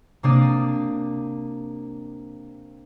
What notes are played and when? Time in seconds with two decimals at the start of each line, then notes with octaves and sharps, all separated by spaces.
0.23 C3 A#3 D4 D5 D#6